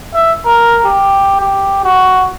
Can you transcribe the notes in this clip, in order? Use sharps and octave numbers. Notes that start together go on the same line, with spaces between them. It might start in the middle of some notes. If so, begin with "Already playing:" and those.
E5
A#4
G4
G4
F#4